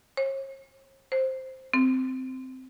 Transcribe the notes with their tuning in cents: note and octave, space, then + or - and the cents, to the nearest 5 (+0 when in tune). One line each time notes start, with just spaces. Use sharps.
C#5 -40
C5 +5
C4 -10